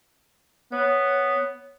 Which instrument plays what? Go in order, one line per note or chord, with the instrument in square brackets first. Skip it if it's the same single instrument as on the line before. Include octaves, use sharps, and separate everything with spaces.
[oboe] B3 [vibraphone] C#5